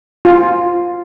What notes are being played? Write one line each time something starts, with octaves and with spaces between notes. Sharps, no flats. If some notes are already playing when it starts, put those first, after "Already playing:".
F4